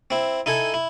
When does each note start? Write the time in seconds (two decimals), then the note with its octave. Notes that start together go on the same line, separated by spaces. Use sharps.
0.10 C4 E4
0.46 D#4 E4 A4 G#5
0.74 E4